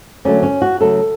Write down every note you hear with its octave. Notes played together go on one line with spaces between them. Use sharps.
D3 F#3 A3 C#4
C#4
F#4
C#3 F#3 A3 A4